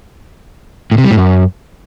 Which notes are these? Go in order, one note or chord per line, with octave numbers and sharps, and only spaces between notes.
A2
C3
G3
A2
F#2